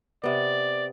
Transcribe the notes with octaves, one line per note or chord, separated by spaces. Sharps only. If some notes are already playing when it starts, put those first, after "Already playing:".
C3 B3 D5